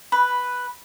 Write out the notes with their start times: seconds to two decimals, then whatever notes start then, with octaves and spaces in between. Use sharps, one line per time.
0.12 B4